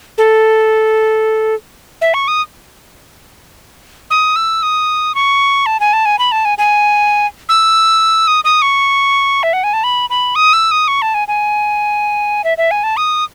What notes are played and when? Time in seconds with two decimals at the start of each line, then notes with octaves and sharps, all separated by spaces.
0.18 A4
2.01 E5
2.14 C#6
2.28 D#6
4.10 D#6
4.36 E6
4.63 D#6
5.15 C#6
5.66 A5
5.80 G#5
5.93 A5
6.06 G#5
6.19 B5
6.32 A5
6.45 G#5
6.58 G#5
7.49 E6
8.28 D#6
8.44 D#6
8.62 C#6
9.43 E5
9.53 F#5
9.64 G#5
9.73 A5
9.84 B5
10.10 B5
10.35 D#6
10.53 E6
10.71 D#6
10.88 C#6
11.02 A5
11.14 G#5
11.28 G#5
12.44 E5
12.58 E5
12.71 G#5
12.84 A5
12.97 D#6